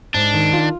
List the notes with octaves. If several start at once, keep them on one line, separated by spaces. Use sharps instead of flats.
G#2 D4
D#3
F4